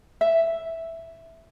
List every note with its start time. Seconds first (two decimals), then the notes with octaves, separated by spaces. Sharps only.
0.21 E5